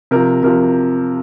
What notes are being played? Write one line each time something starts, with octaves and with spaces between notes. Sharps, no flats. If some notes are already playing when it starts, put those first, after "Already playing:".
C3 F3 A#4
C3 F3 A#4